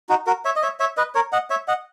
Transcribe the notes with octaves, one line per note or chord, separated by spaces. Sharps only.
D#4 F#4
F#4 A#4
C#5 E5
D#5
C#5 E5
C#5 E5
B4 D#5
A#4 C#5
D#5 F#5
C#5 E5
D#5 F#5